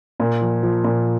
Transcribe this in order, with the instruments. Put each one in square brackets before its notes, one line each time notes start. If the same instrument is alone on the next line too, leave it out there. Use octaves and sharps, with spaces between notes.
[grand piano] A#2
F3
F3
A#2